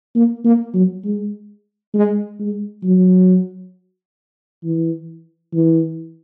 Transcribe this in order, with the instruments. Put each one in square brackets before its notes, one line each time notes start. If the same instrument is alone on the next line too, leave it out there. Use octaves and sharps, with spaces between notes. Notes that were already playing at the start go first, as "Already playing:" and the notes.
[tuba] A#3
A#3
F#3
G#3
G#3
G#3
F#3
E3
E3